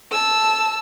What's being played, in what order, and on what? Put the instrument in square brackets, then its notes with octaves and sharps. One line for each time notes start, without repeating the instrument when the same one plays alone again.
[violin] A5 E6